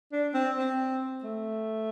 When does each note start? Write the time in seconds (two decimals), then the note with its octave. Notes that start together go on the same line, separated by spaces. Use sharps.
0.13 D4
0.34 C4
0.57 C4
1.24 A3